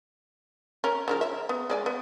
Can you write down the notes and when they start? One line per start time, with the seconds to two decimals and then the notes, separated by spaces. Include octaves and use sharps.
0.84 C#4 A#4
1.08 C#3 F3 A#4
1.21 E5
1.49 B3
1.70 G#3 D5 G#5
1.86 B3